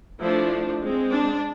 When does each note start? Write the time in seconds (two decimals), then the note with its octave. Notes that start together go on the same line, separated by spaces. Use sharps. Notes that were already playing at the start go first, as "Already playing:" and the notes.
0.19 F3 A3 D4 E4
0.81 G#3 C4
1.11 D4